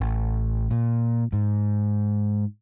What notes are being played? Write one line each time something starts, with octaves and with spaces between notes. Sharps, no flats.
A1
A#2
G#2